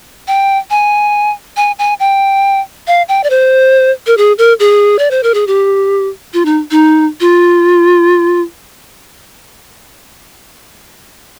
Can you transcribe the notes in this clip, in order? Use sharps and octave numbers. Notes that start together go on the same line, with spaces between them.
G5
G#5
G#5
G#5
G5
F5
G5
D5
C5
A#4
G#4
A#4
G#4
D5
C5
A#4
G#4
G4
F4
D#4
D#4
F4